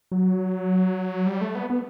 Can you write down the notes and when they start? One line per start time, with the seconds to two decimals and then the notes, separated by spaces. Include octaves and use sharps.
0.12 F#3
1.26 G3
1.41 A3
1.55 B3
1.70 B3